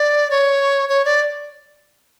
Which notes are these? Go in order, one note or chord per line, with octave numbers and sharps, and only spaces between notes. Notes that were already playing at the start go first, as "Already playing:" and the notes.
Already playing: D5
C#5
C#5
D5